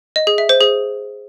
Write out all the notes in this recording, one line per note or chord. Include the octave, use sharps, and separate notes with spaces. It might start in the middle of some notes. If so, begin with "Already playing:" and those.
D#5
G#4
E5
C5
G#4